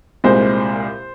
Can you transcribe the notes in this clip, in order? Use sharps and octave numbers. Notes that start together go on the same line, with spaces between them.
C2 A#2 G#3 C5